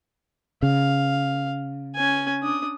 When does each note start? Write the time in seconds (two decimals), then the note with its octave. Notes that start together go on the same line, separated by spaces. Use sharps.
0.63 C#3 F5
1.95 C#4 G#5
2.42 D4 D#6